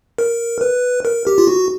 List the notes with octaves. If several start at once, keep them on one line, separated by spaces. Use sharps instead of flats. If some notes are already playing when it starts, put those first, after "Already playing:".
A#4
B4
A#4
G4
F4
F#4